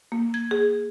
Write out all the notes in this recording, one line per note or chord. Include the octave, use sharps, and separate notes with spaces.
A#3
G#6
G#4